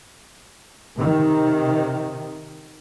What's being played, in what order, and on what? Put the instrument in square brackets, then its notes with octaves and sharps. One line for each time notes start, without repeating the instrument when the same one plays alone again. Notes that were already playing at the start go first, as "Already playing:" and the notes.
[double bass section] C3 D#3